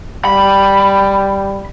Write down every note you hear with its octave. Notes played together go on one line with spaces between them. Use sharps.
G3 B5